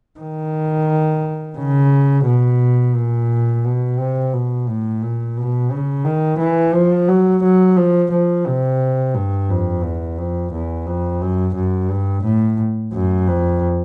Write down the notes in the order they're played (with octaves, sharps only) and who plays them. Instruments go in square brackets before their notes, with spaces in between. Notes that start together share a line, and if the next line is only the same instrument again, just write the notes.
[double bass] D#3
C#3
B2
A#2
B2
C3
B2
A2
A#2
B2
C#3
D#3
E3
F3
F#3
F#3
F3
F3
C3
G2
F2
E2
F2
E2
F2
F#2
F#2
G2
A2
F#2
F2